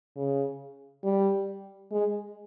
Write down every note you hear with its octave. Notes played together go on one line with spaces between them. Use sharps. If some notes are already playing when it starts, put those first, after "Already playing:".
C#3
G3
G#3